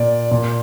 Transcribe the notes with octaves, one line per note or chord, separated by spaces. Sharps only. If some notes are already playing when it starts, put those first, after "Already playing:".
Already playing: A#2 D5
A#2